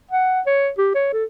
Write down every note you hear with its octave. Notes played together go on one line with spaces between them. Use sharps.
F#5
C#5
G4
C#5
A4